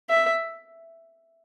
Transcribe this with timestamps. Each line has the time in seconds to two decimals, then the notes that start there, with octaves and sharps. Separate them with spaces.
0.10 E5